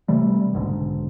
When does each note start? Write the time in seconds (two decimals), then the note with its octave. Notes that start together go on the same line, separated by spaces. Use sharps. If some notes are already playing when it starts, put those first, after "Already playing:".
0.08 C3 E3 G3 A3
0.54 F#1 B1 G#2 D3